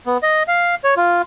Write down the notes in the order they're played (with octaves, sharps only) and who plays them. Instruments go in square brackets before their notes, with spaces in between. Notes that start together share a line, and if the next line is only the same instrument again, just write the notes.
[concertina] B3
D#5
F5
C#5
F4